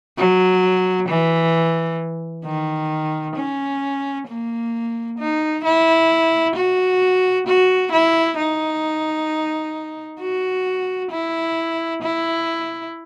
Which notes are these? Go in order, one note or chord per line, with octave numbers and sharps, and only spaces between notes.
F#3
E3
D#3
C#4
A#3
D#4
E4
F#4
F#4
E4
D#4
F#4
E4
E4